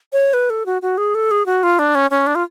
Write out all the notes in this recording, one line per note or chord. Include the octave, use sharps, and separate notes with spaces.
C#5
B4
A4
F#4
F#4
G#4
A4
G#4
F#4
F4
D4
C#4
C#4
D4
F4